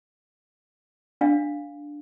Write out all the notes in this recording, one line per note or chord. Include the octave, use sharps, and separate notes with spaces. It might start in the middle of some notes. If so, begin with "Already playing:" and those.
D4 F5